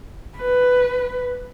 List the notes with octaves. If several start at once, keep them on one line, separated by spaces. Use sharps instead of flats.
B4